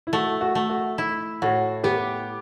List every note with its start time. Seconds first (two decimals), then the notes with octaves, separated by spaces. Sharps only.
0.07 E4
0.13 A3 F#4
0.41 F#4
0.55 A3
0.69 F#4
0.98 E4
1.42 A2 F#4
1.84 B3 G4